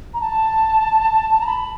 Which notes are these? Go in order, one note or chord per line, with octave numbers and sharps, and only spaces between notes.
A#5
A5
A#5
B5